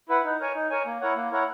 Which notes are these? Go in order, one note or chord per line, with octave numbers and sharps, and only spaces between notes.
E4 B4 F#5
D#4
A#4 C#5 G#5
D#4
A#4 C#5 G#5
A#3
E4 A#4 C#5 F#5
A#3
E4 A#4 C#5 F#5